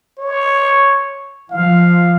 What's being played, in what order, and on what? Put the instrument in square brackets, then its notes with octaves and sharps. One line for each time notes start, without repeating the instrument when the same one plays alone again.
[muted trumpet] C#5
[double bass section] F3 [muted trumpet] F5